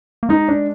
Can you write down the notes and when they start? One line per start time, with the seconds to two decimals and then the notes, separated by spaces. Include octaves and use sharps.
0.23 A#3
0.29 G#3 D#4
0.48 D4